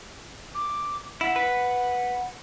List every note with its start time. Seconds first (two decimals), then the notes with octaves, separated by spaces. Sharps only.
0.55 D6
1.21 E4 F#5
1.36 B4